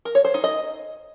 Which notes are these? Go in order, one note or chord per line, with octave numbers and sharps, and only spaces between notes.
A#4
C#5
C5
D#4
D#5